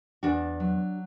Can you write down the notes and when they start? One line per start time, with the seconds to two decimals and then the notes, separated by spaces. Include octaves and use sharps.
0.23 E2 D4 F#4
0.60 F#3